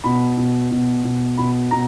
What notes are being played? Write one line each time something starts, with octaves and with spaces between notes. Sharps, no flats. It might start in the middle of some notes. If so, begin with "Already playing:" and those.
B2 B5
B2
B2
B2
B2 B5
B2 A#5